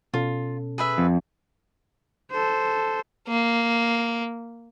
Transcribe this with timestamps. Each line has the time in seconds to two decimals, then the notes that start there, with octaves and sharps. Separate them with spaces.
0.14 B2 C#4 F4 A4
0.78 G#4 B4 E5
0.98 F2
2.31 A4 C5
3.28 A#3